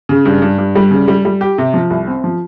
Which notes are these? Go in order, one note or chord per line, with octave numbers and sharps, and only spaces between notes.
C#3
G2
G2
G2
G3
C#3
G3
G3
G4
C3
F3
C2
C4
F3